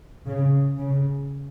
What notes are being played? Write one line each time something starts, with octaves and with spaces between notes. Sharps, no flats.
C#3
C#3